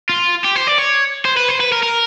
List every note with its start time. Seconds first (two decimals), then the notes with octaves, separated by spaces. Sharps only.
0.09 F4
0.45 G4
0.56 C5
0.67 D5
0.79 C#5
1.25 C5
1.37 B4
1.48 C5
1.60 B4
1.72 A#4
1.83 A#4